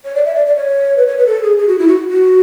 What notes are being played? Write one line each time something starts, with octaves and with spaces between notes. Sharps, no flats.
C#5
D5
E5
D5
D5
C#5
B4
C#5
B4
A4
G#4
G#4
F#4
E4
F#4
F#4